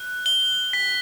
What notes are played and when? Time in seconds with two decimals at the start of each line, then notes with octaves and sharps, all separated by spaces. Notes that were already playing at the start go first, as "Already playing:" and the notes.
Already playing: F#6
0.26 G7
0.73 B6